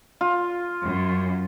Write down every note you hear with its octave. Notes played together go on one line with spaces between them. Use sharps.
F4
F#2